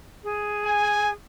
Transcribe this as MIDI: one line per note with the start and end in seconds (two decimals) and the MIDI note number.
0.24 1.13 68
0.66 1.11 80